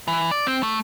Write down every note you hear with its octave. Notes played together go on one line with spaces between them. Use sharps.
E3
D5
C4
A3